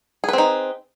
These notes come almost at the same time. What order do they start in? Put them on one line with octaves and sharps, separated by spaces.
G#4 B4 C4 D#4